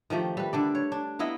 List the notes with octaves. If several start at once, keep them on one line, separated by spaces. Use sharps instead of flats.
D#3 F3 A3 G4
G3 B4
D3 D4 D5
C#5
D4
A#3 B3 E4 D#5